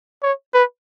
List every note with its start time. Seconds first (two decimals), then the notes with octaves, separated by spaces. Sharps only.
0.23 C#5
0.54 B4